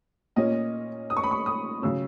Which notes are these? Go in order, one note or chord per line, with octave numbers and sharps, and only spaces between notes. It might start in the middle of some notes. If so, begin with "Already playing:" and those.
A#2 A#3 C#4 D#5
D#6
C#6
B5
C#6
D#6
C#3 F#3 C#4 E6